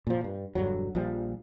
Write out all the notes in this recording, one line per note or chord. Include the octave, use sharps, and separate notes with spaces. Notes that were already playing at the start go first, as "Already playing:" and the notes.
A#2 F3
G2
E1 G2 D3 F#3
A#1 F3 G3